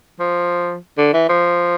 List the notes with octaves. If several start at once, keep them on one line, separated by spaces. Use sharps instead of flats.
F3
D3
E3
F3